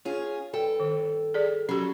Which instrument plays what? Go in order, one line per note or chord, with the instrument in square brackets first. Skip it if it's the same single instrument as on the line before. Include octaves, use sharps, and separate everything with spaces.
[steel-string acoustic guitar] C#4 F4 G#4 [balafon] C#5
[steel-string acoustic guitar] G2 A4 G5
[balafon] D#3
G#4 D5
[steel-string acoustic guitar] F#3 A4 [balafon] C#4 G4